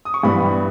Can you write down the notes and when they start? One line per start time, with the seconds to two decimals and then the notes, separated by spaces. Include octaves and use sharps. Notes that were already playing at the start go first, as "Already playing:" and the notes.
0.05 D#6
0.14 C#6
0.23 G2 E3 G3 B3 E4 B5